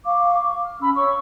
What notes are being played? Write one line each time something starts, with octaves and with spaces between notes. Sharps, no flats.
F5 C#6 D6
C#6
F6
C#4 B5 E6
C#5 C#6 E6